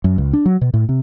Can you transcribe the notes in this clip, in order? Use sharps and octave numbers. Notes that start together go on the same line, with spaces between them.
F#2
C#2
D4
F#3
B2
A2
C3